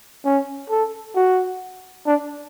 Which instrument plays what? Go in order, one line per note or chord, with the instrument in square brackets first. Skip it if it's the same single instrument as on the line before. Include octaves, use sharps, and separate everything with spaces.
[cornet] C#4
A4
F#4
D4